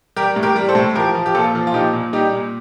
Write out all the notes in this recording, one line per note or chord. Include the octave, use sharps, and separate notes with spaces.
G3 G4 A#4
A2
G4 A#4
G3
A4 C5
A2
F3 G4 A#4
F3
G4
A#2 F4 A4
F3
F4
A#2 D#4 G4
A#2
G3 D#4 G4
A#2